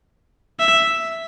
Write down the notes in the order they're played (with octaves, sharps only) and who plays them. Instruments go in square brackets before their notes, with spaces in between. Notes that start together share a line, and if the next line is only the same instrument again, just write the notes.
[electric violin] E5